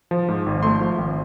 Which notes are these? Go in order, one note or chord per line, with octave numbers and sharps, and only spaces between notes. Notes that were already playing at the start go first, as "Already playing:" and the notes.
F3
G#2
G#1
A3 C6
F3
G#1